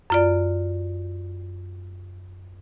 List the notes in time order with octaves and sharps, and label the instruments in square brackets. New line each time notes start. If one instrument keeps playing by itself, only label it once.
[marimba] F#2 F4 D5